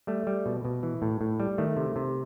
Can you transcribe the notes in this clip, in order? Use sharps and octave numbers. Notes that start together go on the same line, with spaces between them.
G3 A3
G3
B2
B2
E3
A2
A2
G3
D#3 A3
C3
C3